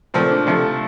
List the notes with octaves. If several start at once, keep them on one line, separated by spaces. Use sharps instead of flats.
A#2 F3 A3 C4
D4
C3 F3 A3